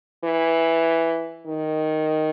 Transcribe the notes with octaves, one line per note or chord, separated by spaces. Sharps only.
E3
D#3